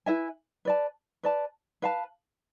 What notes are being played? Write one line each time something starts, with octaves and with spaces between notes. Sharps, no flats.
E4 B4 E5 G#5
B4 D5 A5
B4 D5 A5
B4 F5 A5